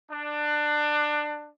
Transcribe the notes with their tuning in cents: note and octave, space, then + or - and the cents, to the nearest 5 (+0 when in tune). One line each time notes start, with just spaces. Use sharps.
D4 +20